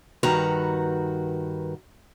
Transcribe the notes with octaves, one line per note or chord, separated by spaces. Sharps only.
G2 D#3 F#4 B4 A#5